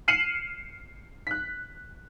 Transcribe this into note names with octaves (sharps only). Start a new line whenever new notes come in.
F6 C7 C#7 D#7 E7 F#7
F#6 B6